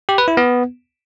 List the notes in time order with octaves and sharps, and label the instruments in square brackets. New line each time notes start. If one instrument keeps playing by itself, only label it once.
[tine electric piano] G4
B4
E4
B3